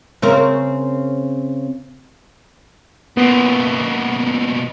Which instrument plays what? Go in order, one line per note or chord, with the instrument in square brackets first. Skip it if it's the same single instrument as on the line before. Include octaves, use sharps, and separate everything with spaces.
[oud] C#3 C4 A#4
[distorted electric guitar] B2 A#3 [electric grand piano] B3